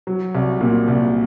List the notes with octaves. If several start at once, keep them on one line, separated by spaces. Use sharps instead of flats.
F#3
C2
A#2
C2